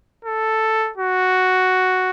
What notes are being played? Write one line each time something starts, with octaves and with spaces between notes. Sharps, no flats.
A4
F#4